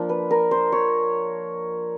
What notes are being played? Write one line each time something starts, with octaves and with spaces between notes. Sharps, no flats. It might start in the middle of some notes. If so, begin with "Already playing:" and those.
Already playing: F3 A#3 D4
B4
A#4
C5
C#5